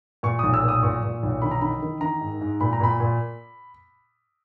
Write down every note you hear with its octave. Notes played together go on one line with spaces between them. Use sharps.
A#2 C#6
B1 D#6
E6
A#2
D#6
A#2 C#6
A#2
B1
D#3 B5
A#5
D#3 B5
D#3
D#3 A#5
G#2
G#2
A#2 B5
A#5
A#2 B5
A#2